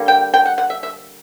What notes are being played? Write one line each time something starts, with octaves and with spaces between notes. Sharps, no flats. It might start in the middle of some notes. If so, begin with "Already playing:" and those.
Already playing: D3 G3 A#3
G5
G5
F#5
F#5
E5
E5